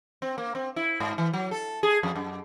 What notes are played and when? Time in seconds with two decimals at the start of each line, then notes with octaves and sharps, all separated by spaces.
0.22 C4
0.38 A#3
0.55 C4
0.76 E4
1.00 G#2
1.18 E3
1.33 F#3
1.51 A4
1.83 G#4
2.03 F2
2.15 F#2